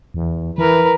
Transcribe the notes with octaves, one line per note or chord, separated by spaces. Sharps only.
E2
E3 A#4 B4